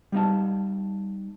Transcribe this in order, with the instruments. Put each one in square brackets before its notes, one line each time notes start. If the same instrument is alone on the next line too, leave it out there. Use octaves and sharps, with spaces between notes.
[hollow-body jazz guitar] G3 B3 D#4 D#5 A5